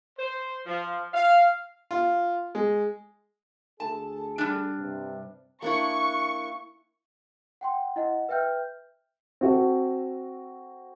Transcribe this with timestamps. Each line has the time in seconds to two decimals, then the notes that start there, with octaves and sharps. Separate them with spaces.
0.19 C5
0.66 F3
1.14 F5
1.91 F4
2.55 G#3
3.80 D2 G#4 A4 A5
4.38 G3 D4
4.78 G2 C3
5.62 A#3 D4 E4 C#6
7.61 F#5 G5 C6
7.96 E4 D#5 F#5
8.29 B4 E5 G5 F6 G6
9.41 C4 F#4 A4